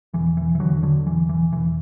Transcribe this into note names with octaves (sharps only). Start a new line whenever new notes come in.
E1 E3
E3
E3
E2 D3 F#3
D3 F#3
E1 E3
E3
E1 E3